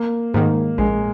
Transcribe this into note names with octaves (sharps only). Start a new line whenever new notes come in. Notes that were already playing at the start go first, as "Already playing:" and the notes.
Already playing: A#3
G#2 D#3 A#3
A#1 G#3